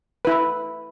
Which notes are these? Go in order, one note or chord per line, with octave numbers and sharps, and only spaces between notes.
E4 B4